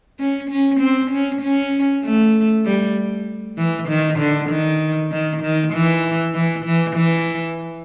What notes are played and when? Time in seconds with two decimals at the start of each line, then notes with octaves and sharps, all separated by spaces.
0.19 C#4
0.50 C#4
0.80 C4
1.11 C#4
1.42 C#4
2.04 A3
2.65 G3
3.58 E3
3.89 D#3
4.19 D3
4.50 D#3
5.11 D#3
5.42 D#3
5.73 E3
6.34 E3
6.65 E3
6.96 E3